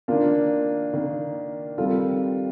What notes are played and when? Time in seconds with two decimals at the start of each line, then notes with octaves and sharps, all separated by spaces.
0.08 D#3 A#3 D4 F4
0.94 D#3 A#3
1.78 D#3 G3 C4 F4 A4